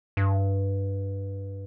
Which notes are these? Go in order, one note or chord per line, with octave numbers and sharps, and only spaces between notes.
G2